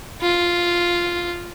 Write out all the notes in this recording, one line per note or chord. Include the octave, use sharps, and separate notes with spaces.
F4